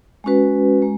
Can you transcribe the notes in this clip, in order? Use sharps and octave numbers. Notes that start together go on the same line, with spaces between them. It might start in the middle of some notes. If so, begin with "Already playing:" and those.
G#3 C#4 F#4 B4
G#3